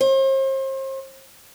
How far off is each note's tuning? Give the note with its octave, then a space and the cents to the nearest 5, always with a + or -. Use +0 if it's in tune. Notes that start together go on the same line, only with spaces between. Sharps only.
C5 +40